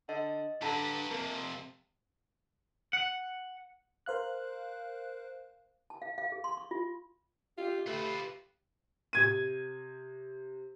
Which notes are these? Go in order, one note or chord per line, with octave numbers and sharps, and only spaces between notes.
D3 D#5
D3 G4 B4 A5 A#5
F2 C3 A#3
F#5
A#4 C5 F5 F#6
A5
F5
F5
G#4
C6
C#6
F4
F4 G4
A3 F4 G4 B4
C3 G#6 D#7